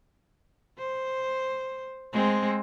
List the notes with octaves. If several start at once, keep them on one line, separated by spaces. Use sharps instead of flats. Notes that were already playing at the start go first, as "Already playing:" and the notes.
C5
G#3 C4